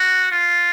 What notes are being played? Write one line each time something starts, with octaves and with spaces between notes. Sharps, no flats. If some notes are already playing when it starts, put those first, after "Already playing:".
Already playing: F#4
F4